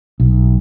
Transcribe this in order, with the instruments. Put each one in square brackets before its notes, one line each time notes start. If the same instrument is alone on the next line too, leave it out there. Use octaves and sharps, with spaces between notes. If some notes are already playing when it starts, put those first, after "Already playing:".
[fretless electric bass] B1